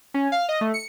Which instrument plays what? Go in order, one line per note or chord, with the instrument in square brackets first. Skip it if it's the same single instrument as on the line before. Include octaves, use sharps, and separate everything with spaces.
[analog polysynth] C#4
F5
D#5
A3
C#7